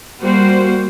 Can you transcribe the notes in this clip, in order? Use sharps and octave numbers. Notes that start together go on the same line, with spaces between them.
G3 A#3 F#4 C5